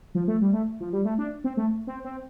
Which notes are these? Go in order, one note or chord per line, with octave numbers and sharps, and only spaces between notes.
F3
A3
G3
A3
F3
G3
A3
D4
C4
A3
C4
C4